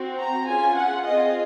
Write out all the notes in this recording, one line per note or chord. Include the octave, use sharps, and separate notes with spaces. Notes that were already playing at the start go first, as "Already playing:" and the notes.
Already playing: C4 F#4
A#5
C#4 F4 G#4 G#5
F#5
C4 F4 G#4 D#5